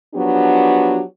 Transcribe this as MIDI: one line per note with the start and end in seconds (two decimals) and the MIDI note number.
0.15 1.02 53
0.15 1.02 54
0.15 1.02 59
0.15 1.02 62
0.15 1.02 66
0.15 1.02 67